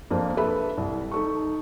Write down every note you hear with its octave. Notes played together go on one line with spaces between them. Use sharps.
F2 A#3 D4 C5
A4 B4 E5 B5
C2
D#4 A4 C#6